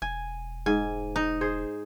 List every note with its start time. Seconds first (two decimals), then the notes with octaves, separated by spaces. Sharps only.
0.02 E1 G#5
0.66 G#2 G#5
1.16 D#4
1.41 G#4 C5